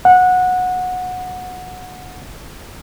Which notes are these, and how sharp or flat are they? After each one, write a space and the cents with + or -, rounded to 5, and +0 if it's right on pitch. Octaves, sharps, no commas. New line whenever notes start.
F#5 -20